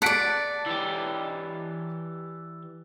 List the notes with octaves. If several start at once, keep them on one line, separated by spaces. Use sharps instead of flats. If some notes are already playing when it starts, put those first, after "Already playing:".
D5 F#5 A5 B6 D7
E3 G4